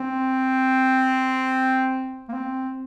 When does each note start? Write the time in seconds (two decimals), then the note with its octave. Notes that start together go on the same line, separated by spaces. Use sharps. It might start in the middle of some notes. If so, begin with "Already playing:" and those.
Already playing: C4
2.29 A#3
2.33 C4